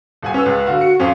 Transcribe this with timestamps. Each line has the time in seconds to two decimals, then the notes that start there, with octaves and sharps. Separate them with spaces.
0.22 D#1 F#5 G#5
0.34 C#4 B4 E6
0.46 C#2
0.66 D3 F#4 F5
0.81 F#4 C#7
1.00 F2 C4 C#4 F5